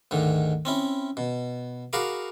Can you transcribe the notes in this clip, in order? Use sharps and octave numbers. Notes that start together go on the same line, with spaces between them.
D2 G#2 D#3
C4 C#4 E4
B2
F#4 G#4 A#4 F5 B5 D6